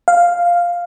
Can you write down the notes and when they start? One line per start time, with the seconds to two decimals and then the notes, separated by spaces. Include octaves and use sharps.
0.08 F5